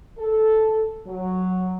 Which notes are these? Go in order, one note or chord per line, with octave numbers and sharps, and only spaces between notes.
A4
F#3